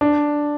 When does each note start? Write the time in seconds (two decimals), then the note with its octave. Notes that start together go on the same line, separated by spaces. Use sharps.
0.01 D4